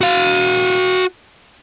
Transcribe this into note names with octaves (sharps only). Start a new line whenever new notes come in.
F#4 F5